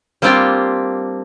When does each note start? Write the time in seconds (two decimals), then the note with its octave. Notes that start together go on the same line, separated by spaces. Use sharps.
0.22 G3 A#3 C4 D4 F4 G4